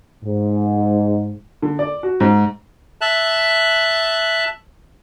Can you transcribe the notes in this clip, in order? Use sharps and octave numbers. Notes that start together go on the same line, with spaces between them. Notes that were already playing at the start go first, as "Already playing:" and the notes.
G#2
D3
D5
F#4
G#2
E5 A5 F#6